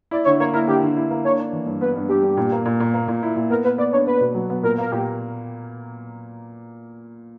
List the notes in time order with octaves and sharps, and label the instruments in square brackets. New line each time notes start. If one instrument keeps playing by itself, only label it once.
[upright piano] E4 [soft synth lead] D5
[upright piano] D3 [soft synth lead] C#5
[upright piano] A#3 [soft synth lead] C#5
[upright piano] E4 [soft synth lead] A#4
[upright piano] D3 [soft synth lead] G4
[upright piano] D3
E4
A#3
[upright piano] D4 [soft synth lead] C#5
[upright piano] D4
E3
G2
[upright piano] B3 [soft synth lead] B4
[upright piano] G2
[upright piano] G2 [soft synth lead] G4
[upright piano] G2
A#2
A#3
A#2
A#2
A#3
A#2
E4
A#2
[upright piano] B3 [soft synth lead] A#4
[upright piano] B3 [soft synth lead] B4
[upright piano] B3 [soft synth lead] D5
[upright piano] D4 [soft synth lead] C#5
[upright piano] B3 [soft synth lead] B4
[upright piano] B2
F#3
B3
[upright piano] A#2 [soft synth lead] A#4
[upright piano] A#3 [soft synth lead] A#4
[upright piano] A#2 [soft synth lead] G4